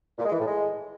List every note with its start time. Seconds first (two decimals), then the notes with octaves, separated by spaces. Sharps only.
0.18 A#2
0.25 G#3
0.32 E3
0.39 A2
0.46 G#3